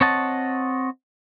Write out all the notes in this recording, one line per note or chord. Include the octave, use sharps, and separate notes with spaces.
C4 C#5 D#5 F#5 A5